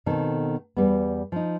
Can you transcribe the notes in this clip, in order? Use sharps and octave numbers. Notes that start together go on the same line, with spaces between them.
B2 D#3 C4 A4
E2 G3 B3
F3 D#4